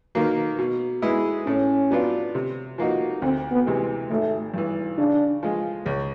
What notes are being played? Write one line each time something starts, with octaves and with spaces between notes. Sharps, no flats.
D#3 F#3 A#3
B2
G#3 B3 E4 G#4
A2 C#4
F#3 B3 D4 F4
C3
F3 A#3 D#4 F#4
D2 C4
B3
C3 E3 G#3
G#1 A3
G2 E3
C#3 D4
F3 G#3
C#2